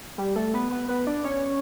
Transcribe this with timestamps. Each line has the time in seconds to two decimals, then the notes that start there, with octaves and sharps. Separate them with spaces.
0.18 G3 G4
0.35 A3 A4
0.54 B3 B4
0.71 B3 B4
0.89 B3 B4
1.06 D4 D5
1.24 C#4 C#5